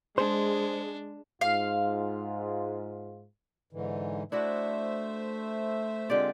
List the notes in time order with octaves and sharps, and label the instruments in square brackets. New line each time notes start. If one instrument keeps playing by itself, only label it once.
[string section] G#3 [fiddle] D4 [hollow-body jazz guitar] C5
[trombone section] G#2 F4 [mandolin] F5
[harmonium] G#2 D3 E3
[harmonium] A3 C5 E5 [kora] D4 E4 F#4
[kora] D3 G4 D5 [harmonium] G#3 C4 F4